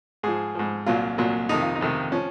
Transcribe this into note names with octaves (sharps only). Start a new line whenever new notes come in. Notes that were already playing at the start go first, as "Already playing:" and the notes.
G#2 F3 G#4
G#2 F3
C2 A#2 F#3 F4
C2 A#2 F#3
F2 C3 D#3 D#4
F4
D#4
F2 C3 D#3
F3 C#4